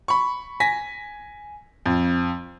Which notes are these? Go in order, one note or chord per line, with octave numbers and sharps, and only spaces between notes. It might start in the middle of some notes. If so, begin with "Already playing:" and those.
B5 C#6
G#5 A#6 B6
F2